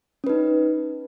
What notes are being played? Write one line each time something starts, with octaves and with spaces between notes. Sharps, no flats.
C#4 D#4 B4